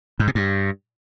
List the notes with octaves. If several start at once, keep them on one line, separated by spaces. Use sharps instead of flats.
G#2
C3
G2